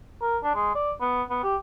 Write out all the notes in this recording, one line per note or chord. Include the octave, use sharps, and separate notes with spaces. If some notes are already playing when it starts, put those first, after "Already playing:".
A#4
D4
G#3
D5
B3
B3
G4